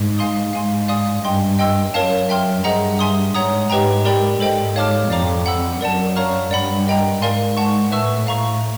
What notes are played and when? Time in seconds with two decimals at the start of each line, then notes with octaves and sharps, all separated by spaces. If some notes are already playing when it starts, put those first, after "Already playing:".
Already playing: G#2
0.18 F5 G#5 C6 D#6
0.53 G#2 F5 G#5 C6
0.88 D5 F5 G#5 C6 D#6
1.23 G2 D#5 G5 C6
1.59 D#5 G5 C6 E6
1.94 F#2 A#4 C#5 F5 A5
2.29 E5 G5 C6 F6
2.64 G2 G#4 C5 D#5 F#5 A#5
2.99 E5 G#5 C6 D#6
3.35 G#2 C#5 F#5 A#5 D#6
3.70 G#2 G4 B4 D#5 G5 A#5
4.05 G4 A#4 D5 G5 B5
4.40 G#2 A4 C5 D#5 G5
4.76 C#5 F5 A5 D6 F6
5.10 F2 D5 F5 A#5 D6
5.46 F#5 B5 E6
5.81 F#2 A#4 D5 F#5 A5
6.16 C#5 F5 A#5 C#6 F6
6.51 G2 D5 F#5 B5
6.86 A#4 D#5 G5 A#5
7.22 G#2 A#4 D5 F5 G#5 C6
7.57 F#5 A5 C#6
7.92 A2 B4 E5 A5 C#6 E6
8.27 F5 A#5 C#6